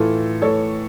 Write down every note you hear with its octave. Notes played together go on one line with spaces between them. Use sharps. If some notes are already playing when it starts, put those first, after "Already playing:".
Already playing: A2 E3 F4 A4
A2 E3 A4 C#5